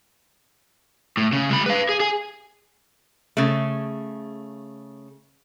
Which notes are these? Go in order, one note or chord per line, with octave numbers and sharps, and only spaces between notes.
A2
C#3
G#3 B5
B4 F5
G#4
G#4 G#5
C#3 A3